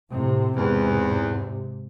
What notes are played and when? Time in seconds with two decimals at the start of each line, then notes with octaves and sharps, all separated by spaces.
0.12 A2 C3
0.56 E2 G#2 C3